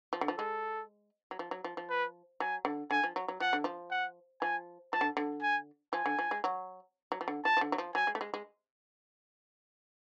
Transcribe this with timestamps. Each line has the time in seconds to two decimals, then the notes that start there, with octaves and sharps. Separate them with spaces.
0.13 F3
0.21 D3
0.28 F3
0.38 G#3 A4
1.31 F#3
1.39 F3
1.51 F#3
1.64 F3
1.77 F3
1.90 B4
2.40 F#3 G#5
2.65 D3
2.91 D3 G#5
3.04 F3
3.16 F#3
3.28 F#3
3.40 F3 F#5
3.53 D3
3.64 F3
3.91 F#5
4.41 F3 G#5
4.93 F3 A5
5.01 D3
5.17 D3
5.42 G#5
5.93 F3 G#5
6.06 D3
6.19 F3
6.31 G#3
6.44 F#3
7.12 F#3
7.21 F3
7.28 D3
7.45 F3 A5
7.57 F3
7.61 D3
7.72 F#3
7.78 F3
7.95 F#3 G#5
8.07 G#3
8.15 A3
8.21 G#3
8.34 G#3